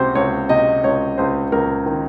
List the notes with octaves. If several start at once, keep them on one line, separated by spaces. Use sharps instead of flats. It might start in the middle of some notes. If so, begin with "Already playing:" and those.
Already playing: C#2 C3 F#4 C5
C#2 C#5
C3 D#5
C#2 C#5
C#2 C5
C#2 A#4
D#3